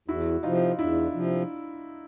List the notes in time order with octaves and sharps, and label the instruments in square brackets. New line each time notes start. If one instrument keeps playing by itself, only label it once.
[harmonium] E2 [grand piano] E4 F#4
[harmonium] C3 F3 [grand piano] D#4 F4
[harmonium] E2 [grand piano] D4 E4
[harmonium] C3 F3